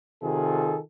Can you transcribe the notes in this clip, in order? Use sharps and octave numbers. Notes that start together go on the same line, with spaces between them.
C3 D#3 F4 G#4 A4